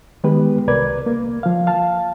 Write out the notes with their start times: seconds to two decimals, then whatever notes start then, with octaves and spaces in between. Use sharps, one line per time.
0.24 D#3 G#3 B3 G4 B4
0.68 C2 A#4 B4 D5 G#6
1.06 A#3
1.43 F3 F5
1.67 F5 A5